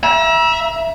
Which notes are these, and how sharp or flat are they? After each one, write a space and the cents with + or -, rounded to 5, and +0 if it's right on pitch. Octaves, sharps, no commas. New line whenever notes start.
E5 +0 A#5 +45